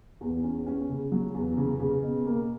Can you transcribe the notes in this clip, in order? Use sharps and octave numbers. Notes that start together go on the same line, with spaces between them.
E2
C#4
C#4
C#3
F#3
E2
C#3
C#3
B2
A#3